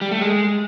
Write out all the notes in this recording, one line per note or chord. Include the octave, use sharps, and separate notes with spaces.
G3
A3
G#3